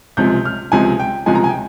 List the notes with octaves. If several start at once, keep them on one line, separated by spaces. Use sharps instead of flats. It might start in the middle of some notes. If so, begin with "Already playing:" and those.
C#2 C3 F3 G#3 G6
F6
C#2 C3 F3 G#3 G#5
G5
C#2 C3 F3 G#3 G#5
A#5
G#5
G5